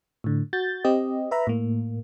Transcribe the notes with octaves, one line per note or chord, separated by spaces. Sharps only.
A2 D3
F#4 G6 A6
C4 G4 D#5
B4 E5 A#5 B5
A2 A#3